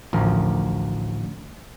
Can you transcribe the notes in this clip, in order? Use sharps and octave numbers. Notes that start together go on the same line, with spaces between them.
A1 D2 F3 A#4